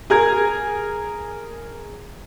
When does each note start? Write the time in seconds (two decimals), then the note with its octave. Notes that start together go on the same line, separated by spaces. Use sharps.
0.10 G#4 A#4 G#6